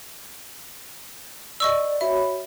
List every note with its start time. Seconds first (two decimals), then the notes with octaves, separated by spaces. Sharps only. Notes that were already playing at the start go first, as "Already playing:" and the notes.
1.60 D5 D#5 C#6 E6
2.01 F#4 C#5 E5 B5